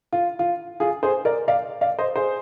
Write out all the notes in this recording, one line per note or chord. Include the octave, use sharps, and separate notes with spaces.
F4
F4
F4 G#4
G#4 C5
A#4 D5
D5 F5
D5 F5
C5 D#5
G#4 C5